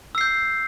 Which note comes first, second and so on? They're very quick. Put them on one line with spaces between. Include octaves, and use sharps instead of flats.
E6 C7 G6